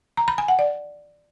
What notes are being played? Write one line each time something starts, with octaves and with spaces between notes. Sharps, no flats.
A#5
B5
G#5
F#5
D5